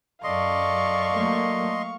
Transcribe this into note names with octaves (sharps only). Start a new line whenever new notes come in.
F#2 A4 D5 D#5 F5 C6 C#6
F#3 A3 A#3